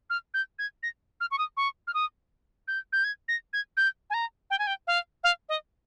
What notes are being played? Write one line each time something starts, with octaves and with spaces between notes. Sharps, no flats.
F6
G6
G#6
A#6
F6
C#6
D#6
C#6
F6
D#6
G6
G6
G#6
A#6
G#6
G6
G#5
A#5
G5
G#5
G5
F5
F5
D#5